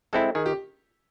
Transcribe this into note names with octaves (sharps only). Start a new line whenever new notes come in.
G#3 C4 E4 A4
D#3 G#4
G4